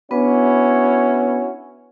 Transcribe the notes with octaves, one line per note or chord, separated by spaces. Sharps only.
B3 C#4 D4 E4 F#4 B4